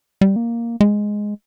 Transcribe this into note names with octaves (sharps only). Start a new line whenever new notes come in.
G3
A#3
G#3